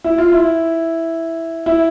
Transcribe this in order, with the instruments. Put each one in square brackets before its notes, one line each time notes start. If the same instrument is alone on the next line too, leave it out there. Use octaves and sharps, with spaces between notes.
[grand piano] E4
F4
E4
E4